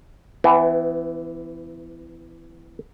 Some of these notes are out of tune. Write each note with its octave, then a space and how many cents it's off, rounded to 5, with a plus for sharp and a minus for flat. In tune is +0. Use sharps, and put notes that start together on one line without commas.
E3 +10 B3 +45